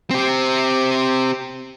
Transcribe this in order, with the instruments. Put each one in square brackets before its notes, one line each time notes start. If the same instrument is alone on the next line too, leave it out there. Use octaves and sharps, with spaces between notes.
[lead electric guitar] C4 G4